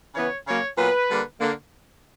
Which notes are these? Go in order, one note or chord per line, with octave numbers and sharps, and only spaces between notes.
C#3 E3 B3 C#5
C#3 F#3 A#3 C#5
A#2 F#3 B3 B4
D3 G3 A#3
D3 A#3